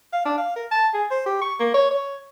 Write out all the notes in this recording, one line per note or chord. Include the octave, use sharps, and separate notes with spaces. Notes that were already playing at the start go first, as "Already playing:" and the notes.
F5
D4
F5
A#4
A5
G#4
C5
G4
C#6
A#3
C#5
C#5